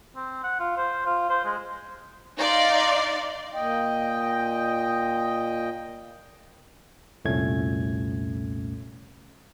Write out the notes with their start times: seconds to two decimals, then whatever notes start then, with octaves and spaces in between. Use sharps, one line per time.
0.16 C4
0.43 F#5
0.60 F4
0.77 C5
1.05 F4
1.29 C5
1.45 G#3
2.37 D#4 D5 F5 C6
3.54 A#2 D#5 G5
7.25 C2 F2 A#2 A3 C#4 G#6